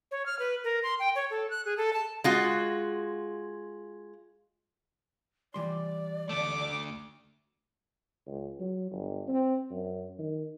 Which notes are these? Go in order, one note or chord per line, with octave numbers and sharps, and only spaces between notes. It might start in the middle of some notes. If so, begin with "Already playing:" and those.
C#5
F6
B4
A#4
C6
G5
C#5
A4
F#6
G#4
A4
A5
G#3 F4 F#4
E3 G3 D5 C6
D2 A3 D6
C#2
F#3
G1
C4
F#2
D#3